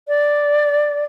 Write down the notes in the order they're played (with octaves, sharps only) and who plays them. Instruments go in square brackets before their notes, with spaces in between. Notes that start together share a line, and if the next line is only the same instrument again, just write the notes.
[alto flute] D5